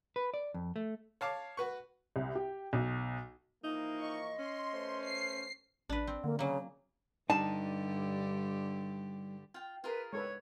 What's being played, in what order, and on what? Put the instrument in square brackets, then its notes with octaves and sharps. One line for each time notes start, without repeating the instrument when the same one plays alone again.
[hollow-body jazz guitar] B4
D5
F2
A3
[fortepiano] C#5 F5 A5 D6
F#4 B4 C#6
[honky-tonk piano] C2
G4
B1
[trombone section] E3 F3 A#3 [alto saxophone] D#4
[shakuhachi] D#5 [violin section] C#6
[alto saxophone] C#4 [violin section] C6
[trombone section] A3 B4 C5
[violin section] C7
[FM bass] A1 [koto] D4 B4
[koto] C4
[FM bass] D3 [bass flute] A#3
[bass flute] C#3 [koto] F#3 A#3
[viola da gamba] G2 D3 G4 [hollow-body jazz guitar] G3 D4 D#4 [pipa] A5
[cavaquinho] F4 G5
[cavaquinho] F4 G#4 A#4 [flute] B4
[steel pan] G#3 A4 B4 [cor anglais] C#5 [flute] G#6